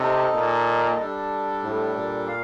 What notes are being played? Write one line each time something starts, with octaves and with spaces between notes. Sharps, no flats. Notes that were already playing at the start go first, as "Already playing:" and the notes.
Already playing: C3 D#4 A4 D#5
A#2
G3 D4 A4
A2
A#2
F5